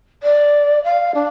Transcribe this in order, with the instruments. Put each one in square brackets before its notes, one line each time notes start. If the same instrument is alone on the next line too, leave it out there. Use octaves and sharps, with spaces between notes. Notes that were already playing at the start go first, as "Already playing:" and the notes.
[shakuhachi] D5
F5
D4